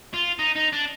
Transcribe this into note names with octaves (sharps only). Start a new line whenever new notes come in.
F4
D#4
D#4
D4